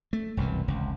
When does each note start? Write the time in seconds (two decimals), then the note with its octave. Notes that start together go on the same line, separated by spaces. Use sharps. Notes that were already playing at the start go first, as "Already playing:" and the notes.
0.13 A3
0.37 E1 C2 F#2 E3
0.68 F1 C#2